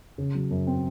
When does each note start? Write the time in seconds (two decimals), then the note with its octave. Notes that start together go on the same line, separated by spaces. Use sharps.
0.18 C#3
0.35 F#3
0.51 F#2
0.67 C4